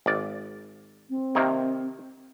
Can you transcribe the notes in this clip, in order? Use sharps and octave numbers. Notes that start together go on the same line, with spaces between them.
G#1 D5
C4
C3 D#3 A#3